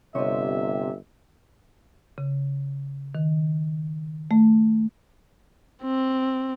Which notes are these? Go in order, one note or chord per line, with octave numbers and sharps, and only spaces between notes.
G1 C3 C#5 D#5 E5
C#3
D#3
A3
C4